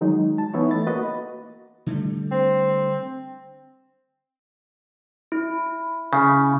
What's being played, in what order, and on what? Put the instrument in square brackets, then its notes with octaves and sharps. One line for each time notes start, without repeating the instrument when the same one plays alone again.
[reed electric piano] D#3 F#3 G#3 D#4
A5
E3 B3 D#4 E4 B4 C#5
A3 A6
A#3 F#4 B4 D#5
[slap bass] D3 G3 A3
[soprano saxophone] C4
[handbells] E4
[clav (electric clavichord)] C#3